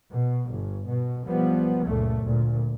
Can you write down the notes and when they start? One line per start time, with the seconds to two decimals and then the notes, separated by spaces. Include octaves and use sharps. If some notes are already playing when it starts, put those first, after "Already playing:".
0.11 B2
0.52 G1
0.88 B2
1.24 B1 F3 G3 B3
1.86 F#1 C#2 A#2 A3
2.22 D2 A#2